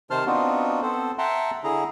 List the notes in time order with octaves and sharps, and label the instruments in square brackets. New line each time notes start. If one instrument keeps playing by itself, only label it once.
[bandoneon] C3 D#3 C5 A5 C6 F6
B3 C4 D4 D#4 F4 F#4
B3 C4 A4 C5
E5 F#5 G5 A5 A#5 C6
D3 E4 G#4 A#5